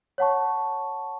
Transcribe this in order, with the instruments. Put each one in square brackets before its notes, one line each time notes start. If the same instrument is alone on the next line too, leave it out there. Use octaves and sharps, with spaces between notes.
[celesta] C#5 F#5 A5 C#6